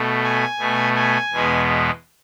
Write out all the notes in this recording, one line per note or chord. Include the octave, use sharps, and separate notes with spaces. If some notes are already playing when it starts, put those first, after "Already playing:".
Already playing: B2 A3
G#5
B2 A3
G#5
E2 B2 G#3 B3